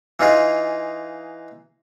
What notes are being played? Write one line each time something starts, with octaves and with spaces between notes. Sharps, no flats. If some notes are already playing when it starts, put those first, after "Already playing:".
E3 D#4 F4 G#4